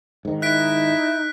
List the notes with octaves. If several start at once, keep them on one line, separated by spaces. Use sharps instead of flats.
G#2 D#3
D#4 E4 F#6 B6 D7